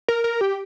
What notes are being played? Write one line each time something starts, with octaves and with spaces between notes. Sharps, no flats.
A#4
A#4
G4